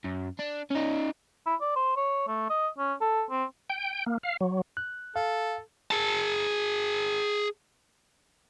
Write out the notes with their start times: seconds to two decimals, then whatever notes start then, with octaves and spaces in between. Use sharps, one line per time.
0.05 F#2
0.39 D4
0.71 C#4 D#4
1.46 E4
1.61 D5
1.76 C5
1.97 C#5
2.28 A3
2.50 D#5
2.78 C#4
3.01 A4
3.30 C4
3.70 G5
4.06 A#3
4.23 F5
4.41 F#3
4.77 F#6
5.16 A4 F5
5.91 G#4 A5